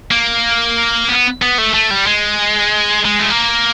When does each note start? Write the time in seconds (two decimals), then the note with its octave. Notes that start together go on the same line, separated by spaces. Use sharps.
0.11 A#3
1.09 B3
1.42 B3
1.58 A3
1.74 A3
1.91 G3
2.07 G#3
3.05 G#3
3.19 A3
3.30 A#3